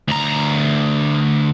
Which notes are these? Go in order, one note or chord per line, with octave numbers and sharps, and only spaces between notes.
D2 A#5